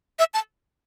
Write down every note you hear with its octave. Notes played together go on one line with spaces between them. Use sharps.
E5
A5